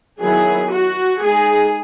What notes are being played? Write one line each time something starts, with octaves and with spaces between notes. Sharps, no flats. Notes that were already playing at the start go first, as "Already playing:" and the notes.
D#3 F#3 B3 E4 G#4
F#4
G#3 D#4 G#4